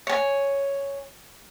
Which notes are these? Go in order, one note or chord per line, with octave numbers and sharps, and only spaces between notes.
C#5 G#5